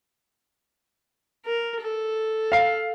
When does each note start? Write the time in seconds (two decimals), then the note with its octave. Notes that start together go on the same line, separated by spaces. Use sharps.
1.46 A#4
1.81 A4
2.52 F5 C7